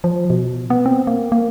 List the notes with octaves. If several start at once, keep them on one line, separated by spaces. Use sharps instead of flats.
F3
B2
B3
C4
A#3
A#3